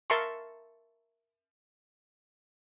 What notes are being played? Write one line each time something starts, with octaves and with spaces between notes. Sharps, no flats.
A#4 E5 A5 A#5 C6 C#6